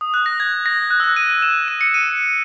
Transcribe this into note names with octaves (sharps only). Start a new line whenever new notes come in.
D#6
F#6
A#6
G#6
A#6
F#6
E6
F#6
D#7
D#7
E7
D#7
C#7
D#7